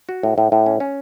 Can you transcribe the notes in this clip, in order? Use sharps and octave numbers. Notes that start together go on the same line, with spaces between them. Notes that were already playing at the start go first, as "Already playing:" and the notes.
F#4
A2
A2
A2
C#4
C#4